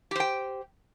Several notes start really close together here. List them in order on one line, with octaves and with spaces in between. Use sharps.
G4 C5 G5